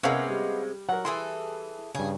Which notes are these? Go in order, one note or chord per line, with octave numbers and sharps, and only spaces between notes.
C3 G#3 B3 C#4 A#4 F5 F#5 E6
G3
F#3 A#4 F#5
E3 E4 G#4 A4 C6
G2 C#3 G#4